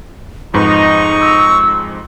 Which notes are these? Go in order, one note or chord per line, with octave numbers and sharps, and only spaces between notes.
F2 G#2 D#4 B4 C#6
E6